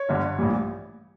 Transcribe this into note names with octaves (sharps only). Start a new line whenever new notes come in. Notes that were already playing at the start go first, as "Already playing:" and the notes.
Already playing: C#5
G1 G2 D3
A#1 A2 E3 G3